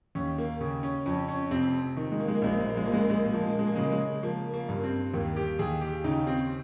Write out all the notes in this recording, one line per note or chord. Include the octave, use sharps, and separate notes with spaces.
D#2 C#4
A#3
C#3 C#4
C#4
F2 C#4
C#4
F1 C4
D#3
G#3
A#3
G#3
A#3
A#1 G#3
A#3
G#3
A#3
G#3
A#2 A#3
G#3
A#3
G#3
A#3
G#3
F3 A#3
G#3
A#3
G#3
A#3
C#3 G#3
A#3
G#3
F3 A#3
A#3
G2
C4
D#2 A#3
G4
D#2 G#4
G4
C#3 D#4
C4